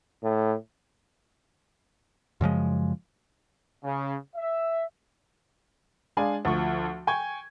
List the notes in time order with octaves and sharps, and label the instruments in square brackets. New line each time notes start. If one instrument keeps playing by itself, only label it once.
[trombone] A2
[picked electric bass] F#2 C#3 F3 G#3
[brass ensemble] C#3
E5
[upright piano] G#3 D4 F5 G#5
D2 F3 C#6
G5 G#5 C#6 G#6